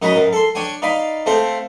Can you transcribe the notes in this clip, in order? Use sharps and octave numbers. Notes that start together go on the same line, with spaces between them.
F#2 D#4 F#4 D#5 A#5 B5
F#2
A4 C6
D4 C#5 G5 G#5
D#4 D5 F5 B5
A3 C4 A4 C5 F5